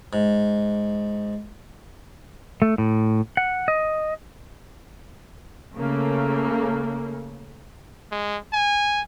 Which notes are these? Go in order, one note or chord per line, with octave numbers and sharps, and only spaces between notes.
G#2
A3
A2
F#5
D#5
C#3 A3 A#3
G#3
G#5